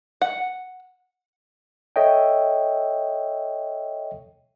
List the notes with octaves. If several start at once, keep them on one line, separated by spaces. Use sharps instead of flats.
F#5
A4 C#5 D#5 E5 G5